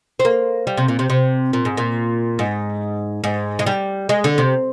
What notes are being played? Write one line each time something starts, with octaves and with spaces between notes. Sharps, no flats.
C4
A#3
G3
C3
A#2
C3
C3
A#2
G#2
A#2
G#2
G#2
G#3
G3
G#3
D3
C3